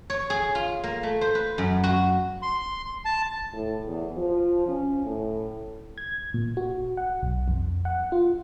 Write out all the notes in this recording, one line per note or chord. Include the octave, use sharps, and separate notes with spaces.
C#5
G#4
F4
A#3
A3
C5
B4
F#2
F#4
C6
A5
A2
E2
F3
C#4
A2
G#6
A#2
F#4
F#5
B1
F2
F#5
F4